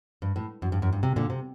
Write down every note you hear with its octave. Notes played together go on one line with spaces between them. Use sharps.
G2
A2
F#2
G2
F#2
G2
C3
A#2 D3
C3